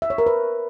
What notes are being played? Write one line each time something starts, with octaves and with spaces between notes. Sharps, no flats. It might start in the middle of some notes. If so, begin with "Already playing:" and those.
E5
C#5
A#4
B4